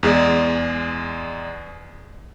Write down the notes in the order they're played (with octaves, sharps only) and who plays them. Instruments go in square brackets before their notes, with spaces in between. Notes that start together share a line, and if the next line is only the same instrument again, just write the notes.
[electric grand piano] E2 G#3 G#4 D5